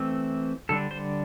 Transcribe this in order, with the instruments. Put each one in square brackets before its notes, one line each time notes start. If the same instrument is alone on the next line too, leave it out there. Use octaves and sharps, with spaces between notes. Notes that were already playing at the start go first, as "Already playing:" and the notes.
Already playing: [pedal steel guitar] E3 A3 C4
D3 G3 D4 A4
C5